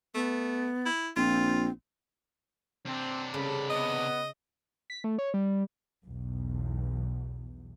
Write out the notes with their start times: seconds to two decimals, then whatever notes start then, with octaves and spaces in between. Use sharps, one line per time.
0.15 A3 B3
0.86 E4
1.16 A#1 C4 F4
2.86 C3 C4 D4
3.34 G2 C#3 A4 B5
3.70 B3 D#5
4.90 B6
5.04 A3
5.19 C#5
5.34 G3
6.04 B1 E2